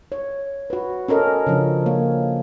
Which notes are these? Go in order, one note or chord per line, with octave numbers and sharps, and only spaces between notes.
C#5
F#4 B4
C#4 A4 A#4 D#5
C#3 F3 D4
A#3 C#5